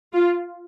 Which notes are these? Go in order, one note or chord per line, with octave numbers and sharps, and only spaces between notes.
F4